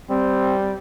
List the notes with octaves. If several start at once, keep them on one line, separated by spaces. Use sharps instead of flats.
G3 C4